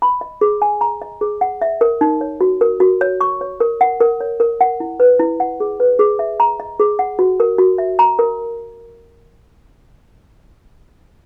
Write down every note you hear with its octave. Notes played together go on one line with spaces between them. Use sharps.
B5
D#5
G#4
G#5
A#5
D#5
G#4
F#5
E5
A#4
D#4
C#5
F#4
A#4
F#4
C#5
C#6
C#5
A#4
F#5
A#4
C#5
A#4
F#5
E4
B4
E4
F#5
G#4
B4
G#4
E5
A#5
D#5
G#4
F#5
F#4
A#4
F#4
E5
A#5
A#4